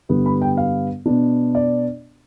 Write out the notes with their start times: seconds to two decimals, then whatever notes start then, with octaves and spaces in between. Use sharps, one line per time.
0.09 G2 D3 G3 B3
0.26 B5
0.42 G5
0.57 F5
1.06 B2 B3 D4
1.55 D5